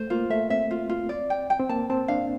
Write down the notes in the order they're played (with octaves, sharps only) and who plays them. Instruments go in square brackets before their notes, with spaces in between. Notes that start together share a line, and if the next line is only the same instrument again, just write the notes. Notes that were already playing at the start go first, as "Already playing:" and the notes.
Already playing: [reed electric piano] A3 [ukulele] C5
[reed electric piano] A#3 [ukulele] F4
[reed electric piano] A3 [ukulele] E5
[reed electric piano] C4 [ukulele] E5
[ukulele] F4
F4
D5
G5
G5
[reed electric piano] C4
[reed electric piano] A#3 [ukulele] A5
[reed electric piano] C4 [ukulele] A5
[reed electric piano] D4 [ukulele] F5